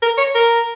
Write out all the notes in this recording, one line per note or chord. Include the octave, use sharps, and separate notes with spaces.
A#4
C#5
A#4